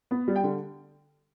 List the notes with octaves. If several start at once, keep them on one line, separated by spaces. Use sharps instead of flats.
B3
G3
G5
D3